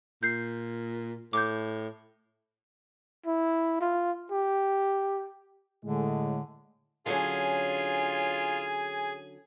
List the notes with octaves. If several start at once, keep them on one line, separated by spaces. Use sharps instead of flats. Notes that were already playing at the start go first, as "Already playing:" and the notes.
A#2 G6 C7
A2 D6 G6
E4
F4
G4
A2 D3 G#3
D3 F#3 C#4 F4 G#4 G#5